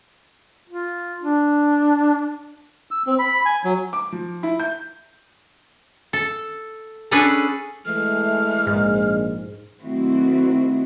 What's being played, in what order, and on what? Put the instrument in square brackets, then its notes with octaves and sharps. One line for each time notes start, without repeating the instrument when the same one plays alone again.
[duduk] F4
D4
[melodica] E6
C4
B5
G#5
F#3
[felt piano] D6
F3
E4
G6
[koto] A4
C#4 D4 G#4 A4 B4
[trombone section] E3 G#3 A3 [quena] F6
[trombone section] A#1 [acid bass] G#2 [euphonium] G#3
[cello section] D#3 F#3 A3 C4 E4 F#4